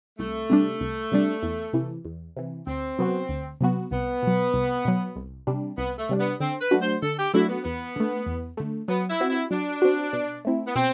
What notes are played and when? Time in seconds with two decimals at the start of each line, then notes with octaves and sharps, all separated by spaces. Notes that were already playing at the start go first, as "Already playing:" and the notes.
0.19 C2 A3
0.50 C3 G3 D4
0.80 C2
1.12 C3 G3 D4
1.43 E2
1.73 C3 E3
2.05 E2
2.37 C3 E3
2.67 D2 C4
2.99 C3 F#3 B3 F#4
3.29 D2
3.61 C3 F#3 B3 F#4
3.91 C2 B3
4.22 B2 F#3
4.54 C2
4.85 B2 F#3
5.16 C2
5.47 C3 G3 D4
5.78 C2 B3
5.98 A3
6.09 C3 G3 D4
6.19 B3
6.40 D3 C4
6.61 B4
6.71 F#3 A3 D4 F#4
6.81 C5
7.03 D3 A4
7.18 G4
7.33 F#3 A3 D4 E4 F#4
7.49 B3
7.64 E2 B3
7.96 D3 A3
8.26 E2
8.57 D3 A3
8.88 F#3 B3
9.10 E4
9.20 C4 F#4
9.30 E4
9.51 F#3 D4
9.82 C4 F#4
10.13 B2
10.45 A3 C4 E4
10.67 B3
10.75 B2 C4